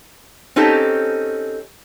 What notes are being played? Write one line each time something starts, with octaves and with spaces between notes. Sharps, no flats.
C4 C#4 D#4 G4 A4